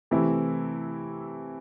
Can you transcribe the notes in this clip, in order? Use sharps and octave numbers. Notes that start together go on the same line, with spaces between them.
C3 E3 A3 C4 E4